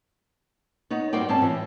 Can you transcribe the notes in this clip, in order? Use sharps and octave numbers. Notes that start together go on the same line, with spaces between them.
B3 D#4 C#5
G2 G3 F#4 C5 D5 G5
G#2 C4 C#4 A5
A2 E3